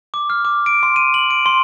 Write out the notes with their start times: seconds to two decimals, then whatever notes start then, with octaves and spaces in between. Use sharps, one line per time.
0.14 D6
0.30 F6
0.45 D6
0.66 D7
0.83 C6
0.96 D#7
1.14 F#7
1.31 D7
1.46 C6